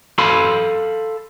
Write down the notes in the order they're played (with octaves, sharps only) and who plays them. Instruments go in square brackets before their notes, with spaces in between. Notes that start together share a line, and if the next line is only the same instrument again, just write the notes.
[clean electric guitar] A4 F5 B5 C6